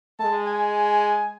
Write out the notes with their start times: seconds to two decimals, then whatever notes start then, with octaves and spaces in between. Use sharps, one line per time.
0.20 G#3 A5
0.47 G#5